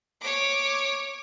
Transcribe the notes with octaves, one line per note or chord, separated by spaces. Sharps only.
C#5 D6